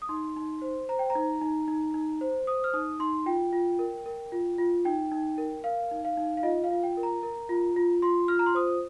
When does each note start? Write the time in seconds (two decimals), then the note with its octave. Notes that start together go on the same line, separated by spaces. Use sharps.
0.02 D#6
0.09 D#4 C6
0.36 D#4
0.62 C5
0.89 C5 A#5
0.99 G5
1.10 A#5
1.16 D#4
1.41 D#4
1.68 D#4
1.94 D#4
2.21 C5
2.47 C5 D#6
2.64 F6
2.73 D#4 D#6
3.00 D#4 C6
3.26 F4 G5
3.53 F4
3.79 A#4
4.06 A#4
4.32 F4
4.58 F4
4.85 D#4 G5
5.12 D#4
5.38 A#4
5.64 A#4 F5
5.91 D#4
6.05 F5
6.17 D#4
6.37 F5
6.43 F4 D#5
6.64 F5
6.71 F4
6.83 G5
6.97 A#4
7.03 A#5
7.23 A#4
7.49 F4
7.77 F4
8.02 F4 C6
8.28 F4 F6
8.39 A#5
8.46 C6
8.55 C5 D#6